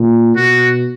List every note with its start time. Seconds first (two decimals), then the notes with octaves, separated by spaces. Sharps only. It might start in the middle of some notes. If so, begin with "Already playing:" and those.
Already playing: A#2
0.37 B2 F#4